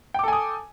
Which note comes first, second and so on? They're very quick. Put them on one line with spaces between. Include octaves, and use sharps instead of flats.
G5 D6 A4 G#5 D#6